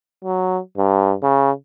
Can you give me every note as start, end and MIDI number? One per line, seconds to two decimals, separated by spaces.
0.24 0.58 54
0.78 1.14 43
1.23 1.51 49